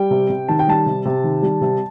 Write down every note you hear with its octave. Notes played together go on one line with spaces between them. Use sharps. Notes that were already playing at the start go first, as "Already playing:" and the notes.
Already playing: G3 G5
C3
C3
D#3 A5
G5
G3 A5
C3
C3
D#3
G3
C3